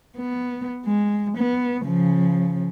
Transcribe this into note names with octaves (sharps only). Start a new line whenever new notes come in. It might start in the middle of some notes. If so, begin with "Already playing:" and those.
B3
G#3
B3
C#3 F3